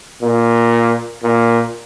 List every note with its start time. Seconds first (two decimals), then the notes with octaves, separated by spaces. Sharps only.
0.22 A#2
1.23 A#2